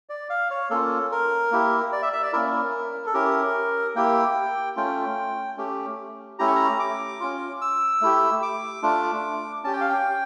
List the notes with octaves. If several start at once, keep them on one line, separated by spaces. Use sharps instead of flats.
D5
F5
C#5
A#3 C#4 F4 A4
A#4
A#3 E4 G4
D5
E5
E5
D5
A#3 C#4 E4 A#4
A4
C#4 E4 G4 A#4
A#3 E4 G4 G5
A3 C#4 F4 G5
A3 C#4 G4
A3 C#4 E4 G4 A#5
C#6
A#5
D6
C#4 F4
E6
A3 E4 G4
D6
A3 D4 F4
C#4 G4 A5
G5
F5
G5